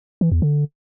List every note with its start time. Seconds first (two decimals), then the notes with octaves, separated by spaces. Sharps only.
0.21 E3
0.32 E2
0.42 D3